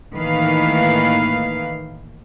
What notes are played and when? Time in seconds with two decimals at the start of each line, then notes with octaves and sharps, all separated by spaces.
0.16 A2 D#3 E3 A#3 B4 F5